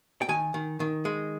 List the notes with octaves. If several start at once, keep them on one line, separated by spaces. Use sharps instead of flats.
G5
D#3 G#5
D#3
D#3
G#3